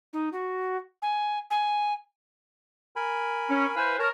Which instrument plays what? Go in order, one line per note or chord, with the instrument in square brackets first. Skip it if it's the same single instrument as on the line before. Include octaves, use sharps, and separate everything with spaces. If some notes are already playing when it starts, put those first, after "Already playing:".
[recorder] D#4
F#4
G#5
G#5
[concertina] A#4 G#5 B5
[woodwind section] C#4
[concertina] E4 F5 [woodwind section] B4 C5 G#5
[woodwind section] A#4 [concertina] C#5 A5